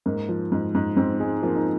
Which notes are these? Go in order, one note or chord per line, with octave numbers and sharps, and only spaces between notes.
G#2 A#3
F3
G#2
G#2
G#2 C4
G#3
F3 A#3
D#4